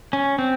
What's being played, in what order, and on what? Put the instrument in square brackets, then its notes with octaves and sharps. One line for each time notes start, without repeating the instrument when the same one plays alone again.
[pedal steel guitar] C#4
C4